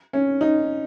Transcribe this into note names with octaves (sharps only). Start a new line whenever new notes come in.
C#4
D#4